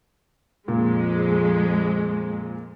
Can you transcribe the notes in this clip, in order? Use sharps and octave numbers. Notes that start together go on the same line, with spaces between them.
F2 A#2 G#3